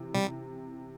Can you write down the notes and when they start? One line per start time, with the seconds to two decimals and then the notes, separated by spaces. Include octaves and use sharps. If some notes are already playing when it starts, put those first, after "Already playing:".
Already playing: C3 E3
0.14 C3 G3